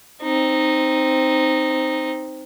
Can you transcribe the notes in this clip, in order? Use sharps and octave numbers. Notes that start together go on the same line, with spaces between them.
C4 D#4